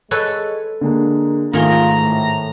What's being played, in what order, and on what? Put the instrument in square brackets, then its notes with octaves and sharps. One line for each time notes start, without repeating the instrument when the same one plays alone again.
[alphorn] G#3 [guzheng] A4 B4 C#5
[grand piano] D3 G#3 A#3 [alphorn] A#4
[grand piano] G#2 A3 G7 [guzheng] D#3 G#4 [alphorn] F4 [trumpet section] A#5
[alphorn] A2